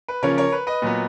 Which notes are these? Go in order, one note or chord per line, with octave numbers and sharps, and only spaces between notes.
B4
C#3 F3 A#3 C#4 A#4 C#5
A#4 C#5
B4
B4 D#5
A#2 F#3 B3